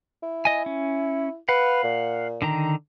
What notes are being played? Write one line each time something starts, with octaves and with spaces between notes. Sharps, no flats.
E4
D#5 G#5
C#4
B4 F5 F#5
A#2
D3 D#3 A#5